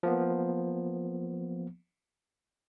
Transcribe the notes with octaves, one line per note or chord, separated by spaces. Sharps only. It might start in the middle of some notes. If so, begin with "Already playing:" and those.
F3 A#3 B3